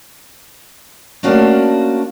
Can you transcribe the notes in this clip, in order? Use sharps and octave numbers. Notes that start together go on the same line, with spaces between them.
A3 A#3 C#4 D4 F4 F#4